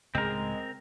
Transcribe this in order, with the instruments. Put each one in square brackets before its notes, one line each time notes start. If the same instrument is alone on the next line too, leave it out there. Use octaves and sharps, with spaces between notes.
[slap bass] C#2 A2 C#3 [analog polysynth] G#3 [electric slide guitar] C4 A#4